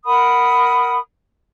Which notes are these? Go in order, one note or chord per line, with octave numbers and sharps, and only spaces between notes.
A#4 F#5 B5 D#6